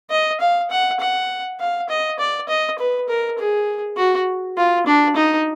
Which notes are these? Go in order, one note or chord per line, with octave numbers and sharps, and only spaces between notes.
D#5
F5
F#5
F#5
F5
D#5
D5
D#5
B4
A#4
G#4
F#4
F4
D4
D#4